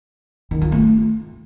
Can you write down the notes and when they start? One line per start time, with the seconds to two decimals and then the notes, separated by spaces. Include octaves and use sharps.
0.51 D#3
0.62 F4
0.72 A3